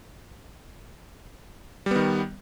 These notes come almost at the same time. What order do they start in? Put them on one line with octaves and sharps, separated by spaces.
G3 B3 D#3